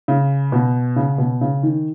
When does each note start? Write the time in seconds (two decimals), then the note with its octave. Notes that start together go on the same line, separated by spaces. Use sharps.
0.08 C#3
0.52 B2
0.96 C#3
1.18 B2
1.41 C#3
1.63 D#3